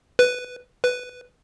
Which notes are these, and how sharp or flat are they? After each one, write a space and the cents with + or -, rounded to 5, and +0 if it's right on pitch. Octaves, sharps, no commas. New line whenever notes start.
B4 +5
B4 +5